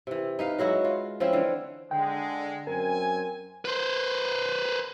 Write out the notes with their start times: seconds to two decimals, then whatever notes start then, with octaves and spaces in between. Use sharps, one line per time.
0.07 C3 E3
0.39 D#4 B4 F5
0.59 F#3 G#3 E4 F#4
0.84 F4
1.20 F3 C4 C#4 E4
1.33 D3 E3 F5
1.91 D3 G#3 G5
2.67 F#2 C4 A#4 G#5
3.65 B4 C5